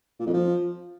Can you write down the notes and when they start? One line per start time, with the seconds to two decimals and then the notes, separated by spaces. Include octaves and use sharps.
0.20 A#2
0.27 F2
0.33 F3